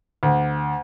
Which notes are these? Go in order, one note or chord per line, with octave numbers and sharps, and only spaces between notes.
D2